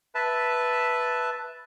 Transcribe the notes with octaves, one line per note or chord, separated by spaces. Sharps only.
B4 E5 A5